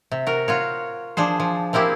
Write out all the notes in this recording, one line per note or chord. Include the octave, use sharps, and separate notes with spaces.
C3
F#4 A#4
F4 F#4 C#5
F3 D4 G#4 C5
F3
A#3 C4 E4 G4 G#4